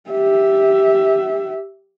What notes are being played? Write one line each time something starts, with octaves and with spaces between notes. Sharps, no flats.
G4 E5